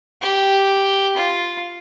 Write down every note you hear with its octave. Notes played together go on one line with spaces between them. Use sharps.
G4
F4